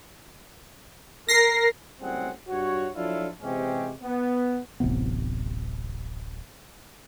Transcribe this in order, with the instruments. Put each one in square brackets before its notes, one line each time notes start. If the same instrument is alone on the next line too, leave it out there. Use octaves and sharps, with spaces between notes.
[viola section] A#4 [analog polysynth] A#6 C7
[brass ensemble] F#1 A2 G3 C4 G#4 F#5
G2 F#4 C#5
F3 F#3 D4 E4 F4 A4
C3 E3 G#3 C4 C#4 G4
B3
[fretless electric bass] D1 A1 C3 B3